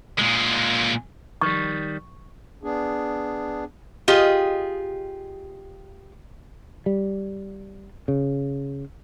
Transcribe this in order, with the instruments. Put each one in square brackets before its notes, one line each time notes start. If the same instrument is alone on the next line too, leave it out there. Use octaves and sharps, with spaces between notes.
[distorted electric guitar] A#2 G#3
[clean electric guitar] D#3 G3 [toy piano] C#6
[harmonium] B3 D4 G#4
[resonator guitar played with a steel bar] F4 G4 G#4 D#5
[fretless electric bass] G3
C#3